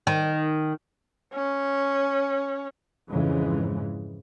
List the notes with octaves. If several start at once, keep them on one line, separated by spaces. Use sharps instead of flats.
D#3
C#4
F2 G#2 C#3 E3 G#3